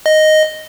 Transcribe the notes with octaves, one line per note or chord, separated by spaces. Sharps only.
D#5